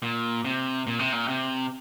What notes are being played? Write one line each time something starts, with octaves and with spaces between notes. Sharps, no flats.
A#2
C3
A#2
C3
A#2
C3